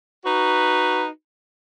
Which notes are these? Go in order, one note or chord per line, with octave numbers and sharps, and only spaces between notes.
D#4 F#4 B4